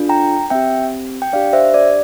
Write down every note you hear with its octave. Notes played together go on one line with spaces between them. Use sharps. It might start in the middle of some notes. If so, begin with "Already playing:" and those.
Already playing: D4 F4 A4
G5 A#5
C4 G4 E5 G5
G5
D4 G4 D5 F5
C5 E5
D5